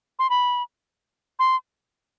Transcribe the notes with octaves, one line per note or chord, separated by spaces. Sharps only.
C6
B5
C6